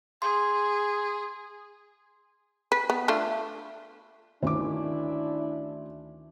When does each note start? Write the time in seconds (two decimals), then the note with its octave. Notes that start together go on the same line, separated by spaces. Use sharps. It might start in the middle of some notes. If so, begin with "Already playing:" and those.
0.22 G#4 C6
2.72 B4
2.90 B3
3.08 A3 D4 F4
4.43 D2 D#3 C#4 D4 E4 D6